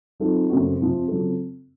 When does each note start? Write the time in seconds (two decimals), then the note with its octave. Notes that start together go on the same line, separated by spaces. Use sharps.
0.20 D#3 F#3 C4 F4 A4
0.49 F#2 C#3 A3 C4 F#4
0.79 F2 C3 F3
1.08 C#3 F#3 C4 F4 A4